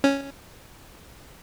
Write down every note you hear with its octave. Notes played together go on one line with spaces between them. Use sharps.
C#4